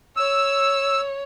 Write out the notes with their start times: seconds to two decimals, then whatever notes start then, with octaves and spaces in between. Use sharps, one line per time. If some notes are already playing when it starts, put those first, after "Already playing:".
0.17 C#5 E6